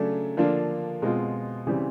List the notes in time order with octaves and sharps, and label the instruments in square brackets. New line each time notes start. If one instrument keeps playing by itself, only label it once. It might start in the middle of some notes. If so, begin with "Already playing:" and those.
Already playing: [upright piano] C#3 F#3 A3 D4
D3 F3 A#3 D4 F4
B2 G#3 C4 F4
C#3 E3 G3 C4